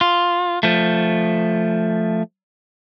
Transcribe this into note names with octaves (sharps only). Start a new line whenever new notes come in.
F4
F3 A3